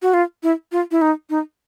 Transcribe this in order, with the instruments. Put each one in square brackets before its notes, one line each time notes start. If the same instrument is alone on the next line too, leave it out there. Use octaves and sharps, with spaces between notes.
[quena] F#4
F4
E4
F4
E4
D#4
D#4